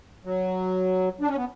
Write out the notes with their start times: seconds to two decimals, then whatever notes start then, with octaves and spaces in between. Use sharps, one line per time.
0.25 F#3
1.21 D4
1.28 C#4
1.37 B3